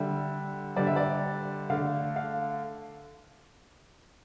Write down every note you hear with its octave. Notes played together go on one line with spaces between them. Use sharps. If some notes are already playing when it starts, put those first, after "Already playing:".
Already playing: D3 G3 E5
D3 G3 D5
E5
D5
D3 A3 F5
F5